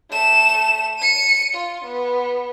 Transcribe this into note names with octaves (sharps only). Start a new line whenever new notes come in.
A3 E7
C#7 D#7
F4
B3